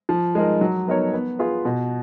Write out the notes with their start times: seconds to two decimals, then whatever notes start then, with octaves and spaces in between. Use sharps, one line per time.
0.09 F3
0.35 G#3 D#4 A#4
0.61 F#3
0.88 B3 D#4 A#4 C#5
1.14 B3
1.39 F4 G#4 B4
1.65 B2